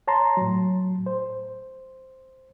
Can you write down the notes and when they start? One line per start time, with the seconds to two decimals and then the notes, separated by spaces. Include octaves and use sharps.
0.08 C#5 A5 A#5 C6
0.37 A2 F#3
1.06 C5